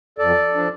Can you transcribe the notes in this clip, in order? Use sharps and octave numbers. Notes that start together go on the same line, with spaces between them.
F2 A4 D5
F3 D4